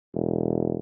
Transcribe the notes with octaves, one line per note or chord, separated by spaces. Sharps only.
E1